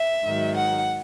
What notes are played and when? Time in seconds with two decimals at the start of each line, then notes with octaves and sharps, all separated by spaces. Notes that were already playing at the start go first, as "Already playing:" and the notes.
Already playing: E5
0.24 G#2 D#3 F#3
0.55 F#5